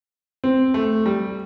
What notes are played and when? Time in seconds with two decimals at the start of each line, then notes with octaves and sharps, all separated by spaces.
0.44 C4
0.74 A3
1.06 G3